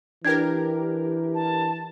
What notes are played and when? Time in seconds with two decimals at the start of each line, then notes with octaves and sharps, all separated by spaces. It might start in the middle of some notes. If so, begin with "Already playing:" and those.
0.25 E3 D4 G4 A#4 G#6
1.34 A5